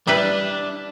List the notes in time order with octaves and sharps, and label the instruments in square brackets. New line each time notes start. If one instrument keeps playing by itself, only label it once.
[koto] G3 E4 B4 [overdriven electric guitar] D4